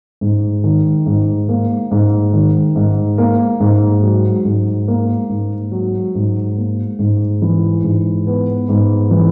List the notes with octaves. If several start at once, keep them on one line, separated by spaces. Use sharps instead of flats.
G#2
D#3
G#2
A#3
G#2
D#3
G#2
A#3
G#2
F#3
G#2
A#3
G#2
F#3
G#2
A#3
G#2
E3
G#2
B3
G#2
E3